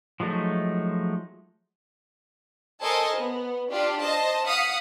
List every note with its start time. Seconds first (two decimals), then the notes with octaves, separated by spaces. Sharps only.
0.20 F3 F#3 G#3 A3 D#4
2.82 A4 A#4 C5 D#5 G#5 A5
3.16 B3
3.70 D4 F4 G4 D5
4.01 C5 D#5 A5
4.45 F5 F#5 D#6 B6 C#7